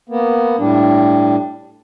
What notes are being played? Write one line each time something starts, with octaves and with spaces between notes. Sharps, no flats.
A#3 B3
A2 G3 D4